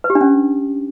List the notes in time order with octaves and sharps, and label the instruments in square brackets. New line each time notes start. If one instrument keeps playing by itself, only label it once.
[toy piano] B4
G4
D4
C#4